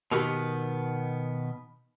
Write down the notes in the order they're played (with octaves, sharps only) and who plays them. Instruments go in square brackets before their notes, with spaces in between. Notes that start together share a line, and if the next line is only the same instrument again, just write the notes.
[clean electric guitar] B2 D#3 B3 [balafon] F#4 G4 A#4